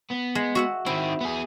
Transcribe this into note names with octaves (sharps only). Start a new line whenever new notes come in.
B3
G#3
F#4 E5 F#5
D#3 C4 E4
B3 G#4